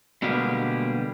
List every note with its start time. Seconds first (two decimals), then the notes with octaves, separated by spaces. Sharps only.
0.22 B2 D3 G3 G#3 A#3 G4